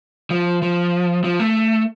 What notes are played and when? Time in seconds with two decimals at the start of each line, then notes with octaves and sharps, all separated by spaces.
0.30 F3
0.62 F3
1.24 F3
1.40 A3